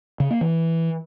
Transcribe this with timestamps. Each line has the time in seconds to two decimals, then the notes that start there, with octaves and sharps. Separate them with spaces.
0.20 C#3
0.31 A#3
0.41 E3